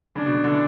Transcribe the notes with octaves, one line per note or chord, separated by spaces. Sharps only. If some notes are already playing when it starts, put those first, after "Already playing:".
C#3 D4
B2
C#3
D3
E3